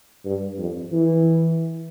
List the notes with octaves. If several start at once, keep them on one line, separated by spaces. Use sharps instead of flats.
G2
F2
E3